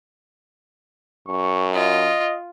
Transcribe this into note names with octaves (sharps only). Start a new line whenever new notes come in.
F#2 C#6
F4 D#5